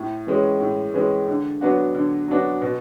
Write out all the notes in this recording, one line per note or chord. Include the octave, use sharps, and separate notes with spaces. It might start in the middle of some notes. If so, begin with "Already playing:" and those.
Already playing: A2
E3 G#3 C#4
A2
E3 G#3 C#4
D3
F#3 B3 D4 F#4
D3
F#3 B3 D4 F#4
B2